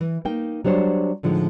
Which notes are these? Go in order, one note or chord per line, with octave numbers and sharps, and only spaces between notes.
E3
A#3 D#4 G5
F#3 G3 D4 C5 C#5
A2 D3 F3 G#3 D#4